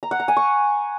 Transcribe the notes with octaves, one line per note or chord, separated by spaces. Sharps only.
A#5
F#5
A#5
G#5
C#6